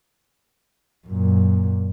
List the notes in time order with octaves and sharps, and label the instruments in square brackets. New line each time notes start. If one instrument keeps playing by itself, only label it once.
[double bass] F#2 A#2